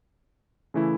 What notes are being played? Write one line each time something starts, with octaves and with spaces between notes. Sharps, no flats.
C#3 E3 A3 E4